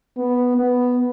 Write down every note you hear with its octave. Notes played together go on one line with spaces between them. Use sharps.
B3
B3